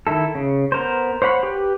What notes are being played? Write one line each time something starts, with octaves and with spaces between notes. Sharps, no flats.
D#3 E4 A4
C#3
B3 A#4 C5
C5 C#5 F#5 B5
G4 B4